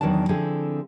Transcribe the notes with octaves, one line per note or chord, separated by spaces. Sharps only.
E2 G#2 D#3 F#3 D4 A5
D3 F3 C4 E4 G#4 A4